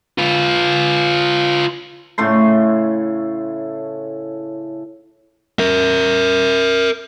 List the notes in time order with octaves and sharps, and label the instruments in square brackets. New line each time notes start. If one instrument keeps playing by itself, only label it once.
[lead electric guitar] F4 B4
[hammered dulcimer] A2 C#3 A3 C6
[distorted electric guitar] A#4 E5